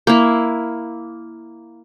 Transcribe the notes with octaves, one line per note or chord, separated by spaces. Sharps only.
A#3 E4